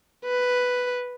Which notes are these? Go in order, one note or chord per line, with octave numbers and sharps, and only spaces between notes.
B4